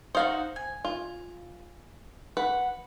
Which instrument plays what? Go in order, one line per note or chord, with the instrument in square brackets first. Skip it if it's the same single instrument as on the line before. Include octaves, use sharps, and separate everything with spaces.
[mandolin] D#4 F4 F#4 [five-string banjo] C5 F5
[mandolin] G#5
[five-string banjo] F4
[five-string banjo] B4 [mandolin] F#5